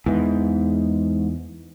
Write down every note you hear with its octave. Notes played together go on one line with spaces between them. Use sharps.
E2 G#2 E3